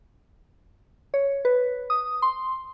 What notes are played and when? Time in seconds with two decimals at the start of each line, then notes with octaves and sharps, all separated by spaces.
1.14 C#5
1.45 B4
1.90 D#6
2.22 C6